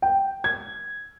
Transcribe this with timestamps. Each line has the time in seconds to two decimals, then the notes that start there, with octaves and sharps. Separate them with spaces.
0.02 G5
0.44 G#6